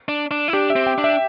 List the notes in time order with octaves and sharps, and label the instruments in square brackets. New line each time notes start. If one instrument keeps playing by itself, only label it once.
[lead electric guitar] D4
D4
E4
[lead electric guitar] D4 [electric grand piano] G4
[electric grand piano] E5
[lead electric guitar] C4
[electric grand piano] G5
[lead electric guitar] D4
[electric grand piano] E5